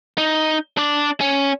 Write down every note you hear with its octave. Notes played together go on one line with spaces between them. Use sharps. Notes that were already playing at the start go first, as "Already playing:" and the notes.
D#4
D4 D5
C#4